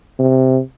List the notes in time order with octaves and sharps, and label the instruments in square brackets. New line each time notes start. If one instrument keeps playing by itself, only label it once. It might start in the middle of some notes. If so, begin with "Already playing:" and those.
[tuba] C3